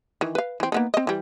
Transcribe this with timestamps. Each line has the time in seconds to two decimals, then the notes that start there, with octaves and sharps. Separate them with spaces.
0.21 D#3 E3
0.35 B4 F5
0.60 E3 C4
0.72 A#3 B3 D#4
0.94 C4 D#5
1.07 E3 G3